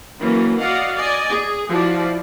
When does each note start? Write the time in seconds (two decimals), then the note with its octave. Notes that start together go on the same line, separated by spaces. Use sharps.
0.20 E3 F#3 A#3 C#4
0.59 F#4 D5 D#5 F5 F#5
0.96 D5 D#5 G#5
1.29 G#4
1.69 F3 E4 F#4 D5